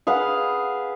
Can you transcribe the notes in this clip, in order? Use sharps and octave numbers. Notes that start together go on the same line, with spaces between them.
G#4 B4 F5 F#5